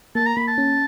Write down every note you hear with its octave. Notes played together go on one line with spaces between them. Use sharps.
A#3 A5
A#5
A#3 B5
A5
C#4